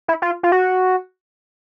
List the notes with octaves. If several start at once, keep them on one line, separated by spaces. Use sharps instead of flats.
E4
F4
F4
F#4